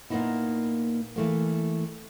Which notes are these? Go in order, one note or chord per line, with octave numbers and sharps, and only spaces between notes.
A#2 A#3 B3 C#4 D#4 E4
E3 A3 A#3